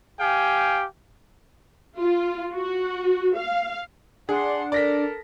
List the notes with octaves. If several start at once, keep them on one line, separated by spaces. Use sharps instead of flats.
G4 F5 G5 G#5
F4
F#4
F5
D4 G#4 F#5 C6
A4 A#4 D5 A#6 B6